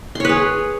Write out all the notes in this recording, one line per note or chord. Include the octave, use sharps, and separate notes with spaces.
G#4 B4 C#5 C6